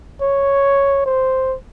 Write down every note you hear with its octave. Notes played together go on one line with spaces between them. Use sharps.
C#5
C5